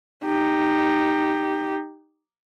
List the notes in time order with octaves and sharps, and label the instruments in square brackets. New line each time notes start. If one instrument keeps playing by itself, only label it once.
[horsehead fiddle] D#4 G4